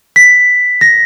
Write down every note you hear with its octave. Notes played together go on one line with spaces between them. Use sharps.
B6
A#6